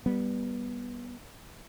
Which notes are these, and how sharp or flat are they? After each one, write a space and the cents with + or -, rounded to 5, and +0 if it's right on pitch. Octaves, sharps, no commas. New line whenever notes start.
G3 +0 B3 -15